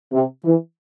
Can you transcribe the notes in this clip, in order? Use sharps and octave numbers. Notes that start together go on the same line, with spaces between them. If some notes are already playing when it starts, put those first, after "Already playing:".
C3
E3